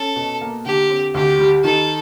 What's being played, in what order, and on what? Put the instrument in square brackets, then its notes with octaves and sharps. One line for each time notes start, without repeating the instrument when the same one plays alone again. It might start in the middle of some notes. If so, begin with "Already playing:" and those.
Already playing: [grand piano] C#4 [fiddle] A4
[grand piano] B2
A#3
[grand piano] D3 [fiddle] G4
[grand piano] C4
[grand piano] D2 [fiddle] G4
[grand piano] G3
[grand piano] D#3 [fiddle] A4